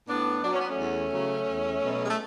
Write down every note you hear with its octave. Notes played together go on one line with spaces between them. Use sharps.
A2 B3 D4
F#3 D4
C#4
B3
A3 C#4
E2
C#3 F#3
E2
B2 F#3
G#3
A3